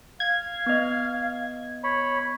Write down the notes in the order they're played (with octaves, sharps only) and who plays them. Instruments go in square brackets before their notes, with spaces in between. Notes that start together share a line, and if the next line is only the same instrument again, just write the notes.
[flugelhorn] F5 [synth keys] G#6
[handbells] B3 D#5
[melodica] C#5 B5